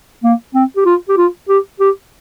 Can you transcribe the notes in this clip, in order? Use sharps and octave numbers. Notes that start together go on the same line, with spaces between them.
A#3
C4
G4
F4
G4
F4
G4
G4